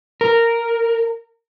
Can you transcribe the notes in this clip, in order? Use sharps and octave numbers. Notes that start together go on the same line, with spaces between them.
A#4